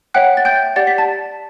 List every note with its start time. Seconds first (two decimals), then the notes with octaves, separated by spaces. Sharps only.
0.14 C#5 E5 F#5 G5 F#6
0.37 A6
0.45 G5 G6
0.76 G4 D5 F#5 A6
0.87 B6
0.98 A5 A6